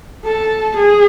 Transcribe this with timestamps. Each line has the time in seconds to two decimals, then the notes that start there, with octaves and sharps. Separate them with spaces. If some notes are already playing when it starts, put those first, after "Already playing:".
0.25 A4
0.77 G#4